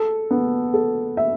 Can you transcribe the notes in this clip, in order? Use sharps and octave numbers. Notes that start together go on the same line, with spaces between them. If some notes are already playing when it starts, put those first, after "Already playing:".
Already playing: A4
B3
A4
E5